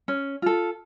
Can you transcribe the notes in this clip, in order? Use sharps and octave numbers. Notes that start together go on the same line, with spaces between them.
C#4
F4 A4